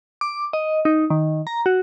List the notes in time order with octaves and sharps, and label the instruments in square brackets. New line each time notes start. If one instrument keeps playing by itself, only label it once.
[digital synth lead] D6
D#5
D#4
D#3
A#5
F#4